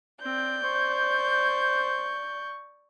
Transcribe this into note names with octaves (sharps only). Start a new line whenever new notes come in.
C4 D5 G6
C5 C#6